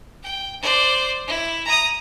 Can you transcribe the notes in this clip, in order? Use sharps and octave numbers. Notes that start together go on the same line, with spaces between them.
G5
C5 D5
E4
A#5 D#6